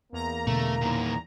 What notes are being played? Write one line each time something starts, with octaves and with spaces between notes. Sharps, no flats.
E2 A#3 A#5
B2 D3 A3
A#2 D#3